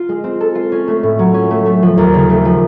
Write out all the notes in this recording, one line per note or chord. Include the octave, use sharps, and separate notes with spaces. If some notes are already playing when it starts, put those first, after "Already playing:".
Already playing: F4
G#3
C4
A4
F4
C#4
A3
A2
F#3
C#4
A3
A3
F3
D#2
C#3
A3
F3